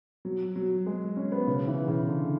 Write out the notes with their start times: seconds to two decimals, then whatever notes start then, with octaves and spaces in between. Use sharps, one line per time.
0.25 F#3
0.56 F#3
0.86 G#3
1.17 C#4
1.32 B3
1.47 C#3
1.68 E3
1.88 C#3
2.08 D3